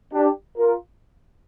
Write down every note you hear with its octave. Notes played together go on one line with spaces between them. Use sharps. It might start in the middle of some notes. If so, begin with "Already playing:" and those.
D4 G4
F4 A#4